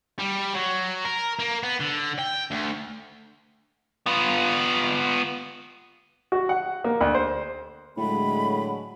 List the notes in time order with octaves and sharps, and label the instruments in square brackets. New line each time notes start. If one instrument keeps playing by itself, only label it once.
[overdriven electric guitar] G3
F#3
A#4
A#3
B3
D3
G5
D2
[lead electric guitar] B3 F4
[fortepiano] F#4
F#5
A#3
D2
C5
[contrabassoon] A2 [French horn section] D3 F#3 G#3 [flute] B5